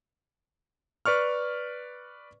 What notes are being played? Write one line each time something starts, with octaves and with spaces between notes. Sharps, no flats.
B4 D5 C#6 F6